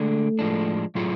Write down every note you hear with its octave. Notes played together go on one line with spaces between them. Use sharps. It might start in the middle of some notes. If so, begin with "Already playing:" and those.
Already playing: D3 G#3 A3 D4
A2 F3 G#3 D4
A2 F#3 A3 F4 G#4